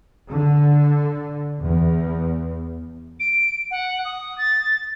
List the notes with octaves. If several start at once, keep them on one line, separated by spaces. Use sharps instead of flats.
D3
E2
D7
F#5
D#6
A6